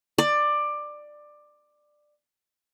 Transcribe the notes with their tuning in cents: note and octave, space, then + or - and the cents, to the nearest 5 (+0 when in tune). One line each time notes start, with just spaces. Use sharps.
D5 +15